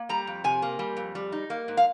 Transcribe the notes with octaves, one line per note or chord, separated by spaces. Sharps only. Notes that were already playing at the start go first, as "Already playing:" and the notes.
Already playing: A#3
G3 A#5
F2
C3 G#5
A#3
G3
F2
G3
D#4
A#3
G#2
F5